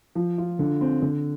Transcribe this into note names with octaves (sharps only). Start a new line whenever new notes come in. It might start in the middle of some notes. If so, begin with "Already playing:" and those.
F3
F4
D3
C4
D3